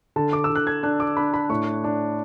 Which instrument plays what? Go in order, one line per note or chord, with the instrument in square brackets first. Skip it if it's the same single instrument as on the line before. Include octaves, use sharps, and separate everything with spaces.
[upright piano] D3 A5
D6
E6
D3
F#6
G#6
D4 F#6
D6
D4 B5
B5
A2 C#6
D4